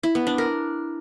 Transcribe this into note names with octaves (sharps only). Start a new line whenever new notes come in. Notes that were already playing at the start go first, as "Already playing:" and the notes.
E4
B3
D4
A#4